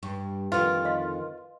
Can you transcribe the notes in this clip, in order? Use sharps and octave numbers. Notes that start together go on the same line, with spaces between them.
G2 C#6
F2 D3 D#3 F4 B4
D#5 F5 C6